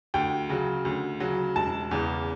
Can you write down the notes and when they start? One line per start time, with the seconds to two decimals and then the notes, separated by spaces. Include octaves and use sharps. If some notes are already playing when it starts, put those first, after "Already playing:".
0.14 D2 G5
0.49 C#3 F#3
0.85 D2
1.20 C#3 F#3
1.56 E1 A5
1.91 E2 C#3 E3